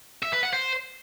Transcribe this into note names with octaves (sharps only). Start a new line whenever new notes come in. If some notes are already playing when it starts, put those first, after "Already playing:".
E5
B4
F#5
C5